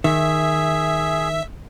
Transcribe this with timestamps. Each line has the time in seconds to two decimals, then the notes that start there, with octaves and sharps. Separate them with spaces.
0.04 D#3 G#4 E5